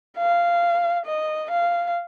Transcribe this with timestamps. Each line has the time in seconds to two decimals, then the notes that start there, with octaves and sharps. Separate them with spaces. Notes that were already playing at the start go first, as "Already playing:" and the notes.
0.18 F5
1.06 D#5
1.51 F5